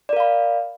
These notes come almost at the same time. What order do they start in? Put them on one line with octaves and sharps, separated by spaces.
D5 A#4 F5 B5